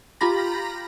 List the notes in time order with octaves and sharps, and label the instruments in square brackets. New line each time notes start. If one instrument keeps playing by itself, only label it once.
[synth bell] F4 G4 A#5 B5 A#6